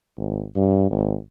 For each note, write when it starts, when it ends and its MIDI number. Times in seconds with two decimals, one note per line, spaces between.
0.18 0.44 32
0.56 0.87 43
0.91 1.16 32